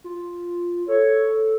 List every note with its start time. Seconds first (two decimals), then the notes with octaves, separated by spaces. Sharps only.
0.04 F4
0.88 A4 C#5